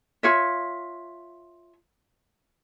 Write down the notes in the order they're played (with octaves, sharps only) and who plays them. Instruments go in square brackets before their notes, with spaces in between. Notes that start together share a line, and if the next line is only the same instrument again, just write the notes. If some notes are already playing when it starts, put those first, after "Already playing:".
[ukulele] F4 C#5 E5